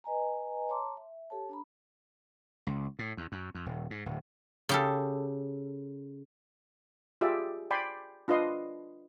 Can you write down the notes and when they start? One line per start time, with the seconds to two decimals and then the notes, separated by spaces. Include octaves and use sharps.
0.04 B4 D#5 G#5 A#5
0.69 C#5 A5 A#5 C6 D6
0.97 E5
1.30 G4 A4 C#5 A5
1.49 D4 A#5 B5
2.67 C#2
2.99 A2
3.17 E2
3.32 F#2
3.55 F2
3.66 D#1
3.90 G#2
4.06 D1
4.69 C#3 G4 A4
7.21 F4 G4 G#4 D5 E5
7.71 D5 G5 G#5 B5 C6
8.28 D4 F4 B4 D#5 C6